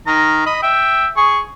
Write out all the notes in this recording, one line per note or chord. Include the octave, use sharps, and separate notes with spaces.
D#3 A#5
D#5 B5
E5 G5
G#4 C#6